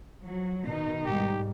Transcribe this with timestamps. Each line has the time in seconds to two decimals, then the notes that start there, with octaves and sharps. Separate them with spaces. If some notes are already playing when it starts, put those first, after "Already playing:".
0.25 F3 F#3
0.67 B2 D#3 D#4
1.06 G#2 G3 G4